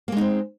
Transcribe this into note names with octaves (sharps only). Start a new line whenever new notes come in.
G#3 A#3 C4 D#4